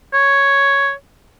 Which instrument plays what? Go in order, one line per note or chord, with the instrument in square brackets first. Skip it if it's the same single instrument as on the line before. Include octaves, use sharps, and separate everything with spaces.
[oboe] C#5